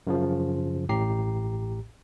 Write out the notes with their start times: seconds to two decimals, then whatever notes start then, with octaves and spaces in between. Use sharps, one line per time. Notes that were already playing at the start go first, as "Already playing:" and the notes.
0.07 F#2 C#3 F3
0.89 A1 A2 G4 A#5 C7